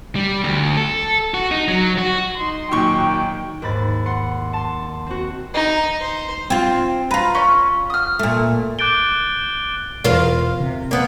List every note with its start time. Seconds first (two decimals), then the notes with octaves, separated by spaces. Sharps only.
0.16 G3
0.44 D2
0.77 A4
1.34 F#4
1.51 D#4
1.68 F#3
1.98 F#4
2.37 D#4 C6
2.71 F#2 A#2 D#3 F#3 D#4 G4 G5 C#6
3.62 D#2 G#2 B5 A6
4.06 F#5 C6 C#7
4.53 A5 C6
5.06 C4 F#4
5.54 D#4
6.00 C5
6.50 C4 F4
7.11 F4 B4 A#5
7.35 C#4
7.90 D#6 F6
8.19 A#2 A3
8.79 D6 F#6 G6 A6 D7 G7
10.04 E2 B2 F4 A#4 C5
10.60 C3
10.91 A#3 B3